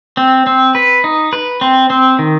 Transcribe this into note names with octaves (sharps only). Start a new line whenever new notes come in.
C4
C4
B4
D#4
B4
C4
C4
D#3